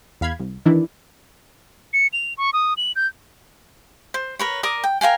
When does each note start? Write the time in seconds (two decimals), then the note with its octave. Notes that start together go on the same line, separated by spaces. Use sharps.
0.21 E2 F5 B5 G#6
0.39 C2
0.65 D#3 E3 D4 E4
1.93 C#7
2.13 F7
2.38 C#6
2.53 D#6
2.77 F#7
2.96 G6
4.14 C5
4.39 A#4 B4 C#5
4.63 A#4 D5 D#6
4.84 G5
5.01 A#4 F5 G5 G#5